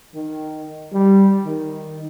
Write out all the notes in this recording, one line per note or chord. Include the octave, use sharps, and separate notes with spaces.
D#3
G3
D#3